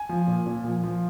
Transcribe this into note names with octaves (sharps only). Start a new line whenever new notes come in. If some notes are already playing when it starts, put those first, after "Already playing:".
Already playing: G#5
F3
A#2
A#2
F3
F3